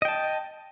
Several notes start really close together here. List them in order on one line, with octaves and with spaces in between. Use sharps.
D#5 G5 A5